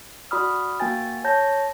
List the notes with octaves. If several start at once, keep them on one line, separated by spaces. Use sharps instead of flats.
F#4 D5 B5 D#6 F6
A#3 F#4 G5 G#5 A6
C#5 A5 G6 A#6